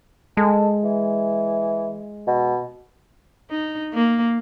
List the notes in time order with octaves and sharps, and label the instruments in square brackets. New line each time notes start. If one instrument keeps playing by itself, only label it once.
[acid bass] G#3 [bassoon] A4
[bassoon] E3
B2
[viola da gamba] D#4
A#3